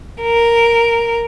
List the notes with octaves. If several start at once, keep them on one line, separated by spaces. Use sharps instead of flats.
A#4